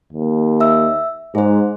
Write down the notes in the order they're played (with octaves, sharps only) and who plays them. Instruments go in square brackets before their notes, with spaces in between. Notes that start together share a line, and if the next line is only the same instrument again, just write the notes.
[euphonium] D#2
[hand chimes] E5 E6
[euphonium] G#2 [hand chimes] G#4 C5